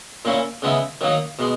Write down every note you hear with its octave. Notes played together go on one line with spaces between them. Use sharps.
A#2 A#3 C#4 E4
C#3 G#3 B3 E4
D#3 F#3 A#3 D#4
B2 G#3